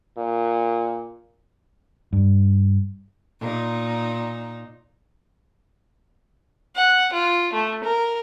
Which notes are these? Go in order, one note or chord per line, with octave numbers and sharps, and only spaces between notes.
A#2
G2
A#2 D#4
F#5
F4
A3
A#4